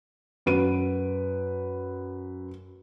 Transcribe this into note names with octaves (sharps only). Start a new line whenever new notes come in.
F#2 B4 D7 D#7